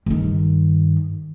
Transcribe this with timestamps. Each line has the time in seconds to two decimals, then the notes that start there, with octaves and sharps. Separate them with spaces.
0.06 G2 D#3